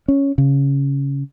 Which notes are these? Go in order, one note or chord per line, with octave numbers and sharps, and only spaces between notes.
C#4
C#3